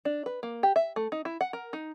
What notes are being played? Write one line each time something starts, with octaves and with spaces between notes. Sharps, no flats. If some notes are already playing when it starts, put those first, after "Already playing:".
D4
B4
A#3
G4
E5
A3
D#4
E4
F#5
A#4
D#4